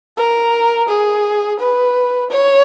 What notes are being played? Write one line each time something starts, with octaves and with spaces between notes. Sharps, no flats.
A#4
G#4
B4
C#5